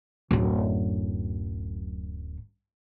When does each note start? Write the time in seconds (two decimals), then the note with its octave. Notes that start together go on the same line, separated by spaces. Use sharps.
0.31 D1 F#2